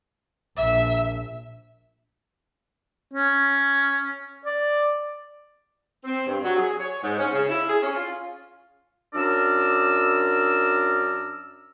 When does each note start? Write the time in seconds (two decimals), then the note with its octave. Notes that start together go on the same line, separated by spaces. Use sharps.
0.57 A#1 E5
3.13 C#4
4.46 D5
6.04 C4
6.27 G2
6.44 F#3
6.57 G#4
6.79 C#5
7.03 G#2
7.18 C#4
7.33 C#3
7.49 E4
7.68 G#4
7.82 C#4
7.95 F4
9.14 F#2 D4 A#4 D5 E6